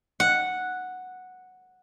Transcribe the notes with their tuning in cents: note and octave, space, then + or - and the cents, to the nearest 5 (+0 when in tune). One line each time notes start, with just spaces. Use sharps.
F#5 -5